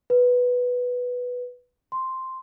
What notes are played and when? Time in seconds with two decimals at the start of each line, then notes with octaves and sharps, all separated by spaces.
0.10 B4
1.92 C6